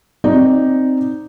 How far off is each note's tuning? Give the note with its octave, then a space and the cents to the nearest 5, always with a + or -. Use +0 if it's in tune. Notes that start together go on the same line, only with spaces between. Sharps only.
C4 +0 D#4 +0 D5 +0